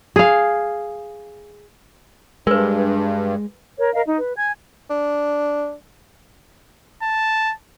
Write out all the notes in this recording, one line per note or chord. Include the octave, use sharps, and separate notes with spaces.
G#4 F5
G2 G#3 A#4 B4
A#4 C#5
A#4 D#5 F5
D#4
B4
G#5 G#6
D4
A5